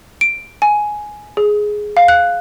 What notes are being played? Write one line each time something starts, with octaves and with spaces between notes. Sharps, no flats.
D7
G#5
G#4
F5
F#6